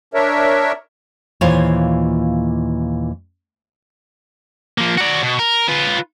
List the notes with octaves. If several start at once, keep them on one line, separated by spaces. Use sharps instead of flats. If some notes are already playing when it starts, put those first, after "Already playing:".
D4 A#4 C#5 E5
D#2 A#2 E3 F4 C5 C#5
F3 A#3
F#4 D5
B2
A#4
F4 B4